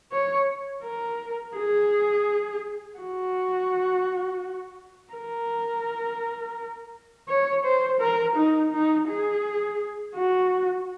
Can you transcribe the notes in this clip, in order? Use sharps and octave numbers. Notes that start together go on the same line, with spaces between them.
C#5
A#4
G#4
F#4
A#4
C#5
C5
A#4
D#4
D#4
G#4
F#4